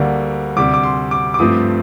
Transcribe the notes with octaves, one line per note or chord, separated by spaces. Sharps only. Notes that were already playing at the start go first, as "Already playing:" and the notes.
Already playing: D2 D3 G3 A#3
D2 C3 G3 D6
D6
C6
D6
D6
G2 F3 A3 C4 D#6